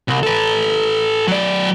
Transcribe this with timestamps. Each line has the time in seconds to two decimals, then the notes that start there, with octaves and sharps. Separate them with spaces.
0.08 C2
0.23 A4 B4
1.28 F#3 D5